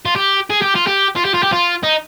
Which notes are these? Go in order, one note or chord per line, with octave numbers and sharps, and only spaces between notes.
F4
G4
G#4
G4
F4
G4
F4
G4
F4
G4
F4
D#4